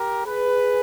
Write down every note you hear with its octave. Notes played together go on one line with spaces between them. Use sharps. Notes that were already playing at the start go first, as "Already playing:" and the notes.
Already playing: G4 A#4
G#4 B4